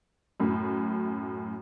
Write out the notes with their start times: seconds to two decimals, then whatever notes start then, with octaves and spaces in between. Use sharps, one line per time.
0.40 F#2 A2